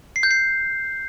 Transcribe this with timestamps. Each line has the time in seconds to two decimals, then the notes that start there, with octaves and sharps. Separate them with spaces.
0.16 C7
0.23 G6
0.31 C7